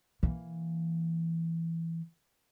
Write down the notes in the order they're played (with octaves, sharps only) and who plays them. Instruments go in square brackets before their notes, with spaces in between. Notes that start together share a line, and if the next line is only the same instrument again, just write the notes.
[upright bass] E3 A#3